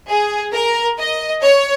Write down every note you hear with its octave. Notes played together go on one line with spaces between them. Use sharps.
G#4
A#4
D#5
C#5